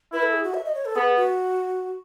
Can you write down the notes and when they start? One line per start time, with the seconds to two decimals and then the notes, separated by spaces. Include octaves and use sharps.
0.13 E4 B4
0.23 A4
0.33 G#4
0.44 F#4
0.54 E5
0.65 D#5
0.75 C#5
0.85 A4
0.96 B3 G#4
1.17 F#4